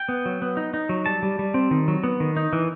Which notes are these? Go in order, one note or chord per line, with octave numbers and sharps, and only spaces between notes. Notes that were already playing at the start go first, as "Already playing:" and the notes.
Already playing: G5
B3
F#3
B3
D#4
D#4
F#3
G3 A5
G3
G3
C4
D#3
F#3
B3
D#3
D#4
E3